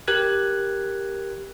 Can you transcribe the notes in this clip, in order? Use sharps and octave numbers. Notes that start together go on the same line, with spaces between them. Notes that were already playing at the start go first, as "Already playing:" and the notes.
G4 A#4 F#6 G#6